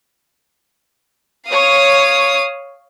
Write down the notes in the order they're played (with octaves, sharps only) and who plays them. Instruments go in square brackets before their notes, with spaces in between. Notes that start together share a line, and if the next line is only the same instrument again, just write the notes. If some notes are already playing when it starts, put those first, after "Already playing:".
[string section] C#5 [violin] F5 D#6